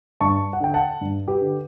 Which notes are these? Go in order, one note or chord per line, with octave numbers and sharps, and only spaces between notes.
G2 A5 C#6
F#5
D3 G5
F#5 A5
G2
G4 B4
D3